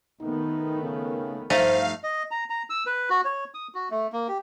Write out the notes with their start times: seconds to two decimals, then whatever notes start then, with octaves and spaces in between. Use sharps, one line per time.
0.21 D#3 A3 B3 D#4
0.82 C#3
1.50 G2 F3 A3 D#4 C5 F5
2.03 D#5
2.31 A#5
2.50 A#5
2.70 E6
2.86 B4
3.10 F#4
3.25 C#5
3.54 D#6
3.75 F#4
3.91 A3
4.12 A#3
4.28 G4